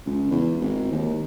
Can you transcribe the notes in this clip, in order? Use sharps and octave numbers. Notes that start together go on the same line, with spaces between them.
C#2
E2
G#1
D#2